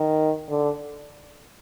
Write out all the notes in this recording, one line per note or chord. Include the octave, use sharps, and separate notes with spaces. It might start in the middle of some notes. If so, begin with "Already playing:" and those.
Already playing: D#3
D3